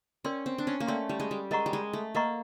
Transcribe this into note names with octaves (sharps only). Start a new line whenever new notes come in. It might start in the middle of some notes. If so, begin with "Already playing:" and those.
C#4 A#4 D5 G5 C6
C4
D4
C#4
A#3
A3 A#4 D5 G5 C6
G3
G#3
G3
G#3 A#4 D#5 F#5 A#5 C#6
G3
G#3
A3
A#3 A#4 D#5 F#5 A#5 C#6